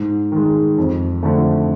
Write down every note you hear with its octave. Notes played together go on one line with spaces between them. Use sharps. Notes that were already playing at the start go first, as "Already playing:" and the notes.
Already playing: G#2
D#3 G#3
F2
D3 F3 A3